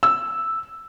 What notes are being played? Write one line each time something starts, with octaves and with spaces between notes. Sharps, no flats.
E6